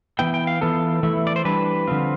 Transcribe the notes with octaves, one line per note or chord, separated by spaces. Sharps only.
E3 B3 E4 G5
G5
F5
E3 B3 F4 A4
E3 A3 E4
D5
C5
E3 G3 D4 B4
D3 F3 C4 F4